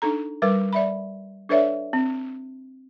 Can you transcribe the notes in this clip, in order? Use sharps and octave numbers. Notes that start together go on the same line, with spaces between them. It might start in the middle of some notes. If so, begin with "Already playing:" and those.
D4 D#4 A4 A#5
G3 A#4 B4 D6
D5 E5 B5
D4 A4 B4 C#5 D5 E5
C4